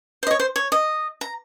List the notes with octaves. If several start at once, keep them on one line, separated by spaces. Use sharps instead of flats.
C5
D#5
C#5
C5
C#5
D#5
A#5